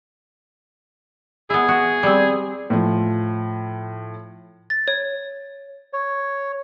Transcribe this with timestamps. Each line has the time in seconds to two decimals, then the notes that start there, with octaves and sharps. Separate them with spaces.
1.50 B3 E4 G#4
1.68 F#4
2.03 G3 C4
2.70 A2 F3
4.70 A6
4.88 C#5
5.93 C#5